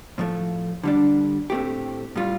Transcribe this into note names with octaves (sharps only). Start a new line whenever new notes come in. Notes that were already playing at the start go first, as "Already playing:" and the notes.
A2 F3 A3
D3 G3 D4
A2 A3 C4 G4
A2 G3 F4